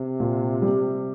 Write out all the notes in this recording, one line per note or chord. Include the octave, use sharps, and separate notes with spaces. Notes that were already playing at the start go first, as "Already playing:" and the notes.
Already playing: C3
A#2
G3